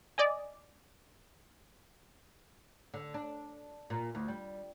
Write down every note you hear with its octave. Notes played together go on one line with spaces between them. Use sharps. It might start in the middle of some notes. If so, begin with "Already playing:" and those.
D5 D#5 G#5
D3
D4
A#2
D2
G3